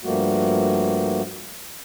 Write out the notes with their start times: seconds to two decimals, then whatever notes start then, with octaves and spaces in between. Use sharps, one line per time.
0.04 G2 F3 G3 A3 A#3 F#4